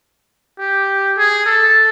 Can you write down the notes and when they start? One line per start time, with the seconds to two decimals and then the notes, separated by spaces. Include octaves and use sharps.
0.59 G4
1.17 G#4
1.46 A4